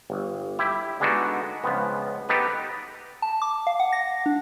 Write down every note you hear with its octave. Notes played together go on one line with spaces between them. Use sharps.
G1
E4 G4
D3 G#3 B3 D4 D#4 F#4
C#2 C#3 F3 B3
B3 D#4 G4 A4 B4
A5
D6
F5
F#5
A#6
D4